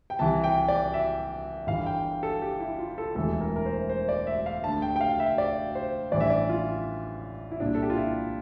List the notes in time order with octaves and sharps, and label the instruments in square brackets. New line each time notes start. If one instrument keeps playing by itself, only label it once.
[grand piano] G5
C2 C3 E3 A5
G5
D5
E5
G1 G2 E3 F5
G5
A4
G4
E4
F4
A4
E1 D2 C3 E3 A4
A#4
A#4
C5
C5
D5
E5
F5
D2 D3 A5
G5
G5
F5
E5
D5
C5
A1 G2 E3 D5
E5
D5
F4
E4
C2 A#2 D4
A4
G4
F4
E4